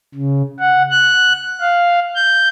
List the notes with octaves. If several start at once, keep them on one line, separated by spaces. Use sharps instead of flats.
C#3
F#5
F#6
F5
G6